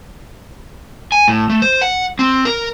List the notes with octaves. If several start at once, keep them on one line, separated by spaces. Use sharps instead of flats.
G#5
A2
A3
C5
F#5
C4
A#4